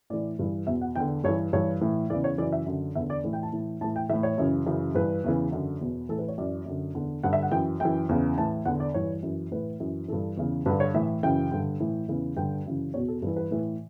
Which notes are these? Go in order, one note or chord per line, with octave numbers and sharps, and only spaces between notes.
A2 E3 D5
G2 E3
E2 B2 E5
F#5
E2 D3 G5
G2 E3 C#5
G2 E3 C#5
A2 E3
E2 C#3 E3 D5
C#5
F#2 C#3 E3 D5
E5
F#2 D3
E2 D3 E5
D5
A2 E3
G5
A5
A2 E3
A2 E3 A5
G5
A2 E3 E5
C#5
F#2 C#3 E3
F#2 C#3 E3
G2 E3 B4
E2 C#3 E3
F#2 D3
E2 B2
A2 E3 A4
B4
C#5
F#2 E3 D5
F#2 D3
E2 D3
G2 D3 F#5
E5
F#5
F#2 E3 G5
F#2 E3 G5
E2 C#3 E3
A2 E3 A5
E2 D3 F#5
D5
G2 E3 C#5
F#2 E3
A2 E3 B4
F#2 E3
G2 E3 A4
E2 C#3 E3
G2 D3 B4
C#5
A2 E3 E5
F#2 C#3 E3 G5
G2 D3
A2 E3
E2 C#3 E3
G2 D3 G5
F#2 C#3 E3
E2 B2 C#5
A4
G2 E3 B4
B4
A2 E3